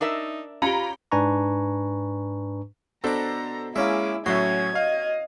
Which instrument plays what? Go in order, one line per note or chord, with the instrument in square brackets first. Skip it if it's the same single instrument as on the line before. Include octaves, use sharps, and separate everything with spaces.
[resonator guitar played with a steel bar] D4 A#4 E5 [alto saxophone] D#4
[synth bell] C#4 G4 [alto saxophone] F4 [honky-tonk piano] A#5 B5
[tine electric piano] G#2 D4 B4 G#5 A#5 C#6
[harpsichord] B2 D6 [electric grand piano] D4 A4 C5 [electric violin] A#5
[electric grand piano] G#3 [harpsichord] A#3 C#4 E5 [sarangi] E4 [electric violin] G#4 D6
[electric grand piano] A2 F#3 E5 [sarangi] C#4 [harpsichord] F#4 C6 [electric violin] G#6
[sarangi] D#5 [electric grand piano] F5